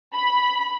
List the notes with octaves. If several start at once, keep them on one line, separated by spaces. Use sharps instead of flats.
B5